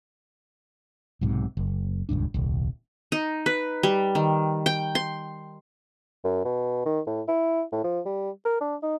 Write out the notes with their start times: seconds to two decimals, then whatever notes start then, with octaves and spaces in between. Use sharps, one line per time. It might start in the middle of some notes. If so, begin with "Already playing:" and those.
1.21 B1 G#2 C3
1.57 F#1
2.09 D#1 C#2 G2 D4
2.34 D#1 C2
3.12 D#4
3.46 B4
3.83 G3
4.15 D#3
4.66 G5
4.95 C6
6.24 F#2
6.45 B2
6.86 D#3
7.07 A2
7.28 E4
7.72 A2
7.84 F3
8.05 G3
8.45 A#4
8.61 D4
8.82 D#4